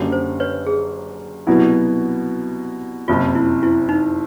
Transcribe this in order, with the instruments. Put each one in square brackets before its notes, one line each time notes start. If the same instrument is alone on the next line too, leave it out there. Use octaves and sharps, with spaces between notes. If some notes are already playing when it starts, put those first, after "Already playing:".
Already playing: [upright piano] F#1 F#2 D3 G3
[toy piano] C5
B4 C#5
G#4
[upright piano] C2 B2 F#3 B3 E4
[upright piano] F#1 F2 C3 [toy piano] F4
[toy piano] E4
E4
D#4